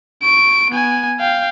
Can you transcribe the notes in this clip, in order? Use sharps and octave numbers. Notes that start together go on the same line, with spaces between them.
C#6 D7
B3 G#5
F5 G5